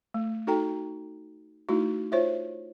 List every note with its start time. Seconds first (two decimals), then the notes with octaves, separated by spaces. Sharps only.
0.14 A3
0.47 D#4 F#4 A4 G5 A#5
1.69 A3 D#4 E4 F#4
2.12 F4 C5 C#5 E5